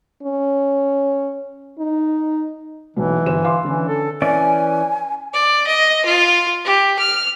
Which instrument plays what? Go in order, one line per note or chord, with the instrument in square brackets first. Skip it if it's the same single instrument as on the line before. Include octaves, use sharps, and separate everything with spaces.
[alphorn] C#4
D#4
[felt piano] B1 B2 [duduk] E3
[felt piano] G1 C5 E7
F5 C6 D6
[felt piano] D3 C#4 [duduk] E3
[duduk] A4
[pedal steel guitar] E3 C#4 D5 [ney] G#5
[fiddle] D5
D#5
F4
G4
F6